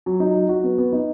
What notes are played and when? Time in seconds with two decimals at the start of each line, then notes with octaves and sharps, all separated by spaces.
0.06 F#3
0.20 D#4
0.35 F#3
0.49 F#4
0.63 B3
0.78 B3
0.93 D#4